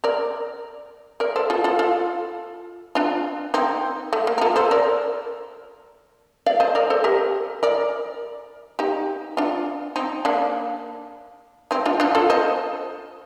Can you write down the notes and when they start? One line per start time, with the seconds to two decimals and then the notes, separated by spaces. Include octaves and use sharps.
0.04 A#4 D5
1.20 A#4 D5
1.36 A4 C5
1.50 F4 A4
1.64 F4 A4
1.79 F4 A4
2.95 D4 F4
3.54 C4 D#4
4.13 A3
4.27 A#3
4.38 A#4
4.41 F4 A4
4.56 A4 C5
4.71 A#4 D5
6.46 D5 F5
6.60 C5 D#5
6.75 A#4 D5
6.90 A4 C5
7.04 G4 A#4
7.63 A#4 D5
8.79 D#4 G4
9.37 D4 F4
9.96 C4 D#4
10.25 A#3 D4
11.71 C4 D#4
11.86 D4 F4
12.00 D4 F4
12.15 F4 A4
12.30 C5 D#5